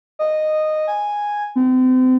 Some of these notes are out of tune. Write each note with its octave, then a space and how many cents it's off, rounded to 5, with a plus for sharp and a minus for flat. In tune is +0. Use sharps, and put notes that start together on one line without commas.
D#5 -10
G#5 -5
C4 -35